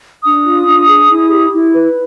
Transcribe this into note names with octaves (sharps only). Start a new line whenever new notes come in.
D4 D#6
F4
D4
G#4
E4
G4
E4
B4